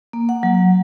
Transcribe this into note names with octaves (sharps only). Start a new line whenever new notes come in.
A#3
F#5
F#3